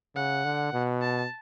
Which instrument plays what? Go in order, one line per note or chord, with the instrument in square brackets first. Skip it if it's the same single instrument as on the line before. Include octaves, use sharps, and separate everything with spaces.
[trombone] C#3 [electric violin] F#5
[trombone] D3
B2
[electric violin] A5